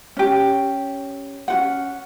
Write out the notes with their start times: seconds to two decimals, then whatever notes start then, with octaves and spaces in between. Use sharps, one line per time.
0.17 C#4 G4
1.48 C#4 F#4 F#5